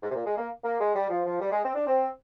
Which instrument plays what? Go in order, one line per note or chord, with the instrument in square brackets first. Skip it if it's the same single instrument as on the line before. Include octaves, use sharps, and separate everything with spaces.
[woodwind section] G#2
C3
A#2
G#3
A#3
A#3
G#3
G3
F3
F3
G3
G#3
C4
D4
C4